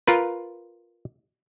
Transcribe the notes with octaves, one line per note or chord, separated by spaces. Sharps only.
F4 A#4 B4